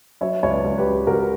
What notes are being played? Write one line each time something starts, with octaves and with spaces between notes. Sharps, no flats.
F#3 C#5 E5
C#2 C#5
B4 D5
C#2
G4 B4
F#3
C#2 F#4 A#4